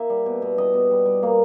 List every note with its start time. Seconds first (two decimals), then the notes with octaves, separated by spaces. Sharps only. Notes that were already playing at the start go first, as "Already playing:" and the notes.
Already playing: A#3 E5
0.10 G3
0.26 B2
0.42 B2
0.58 G3 D#5
0.74 B2
0.91 G3
1.06 G3
1.23 A#3